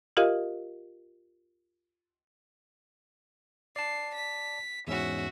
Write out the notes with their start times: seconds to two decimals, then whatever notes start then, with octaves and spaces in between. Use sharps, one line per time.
0.17 F4 G4 A#4 D#5 F5
3.76 D5 A5 C7
4.15 B6
4.87 E2 G#2 C#4 F#4 E5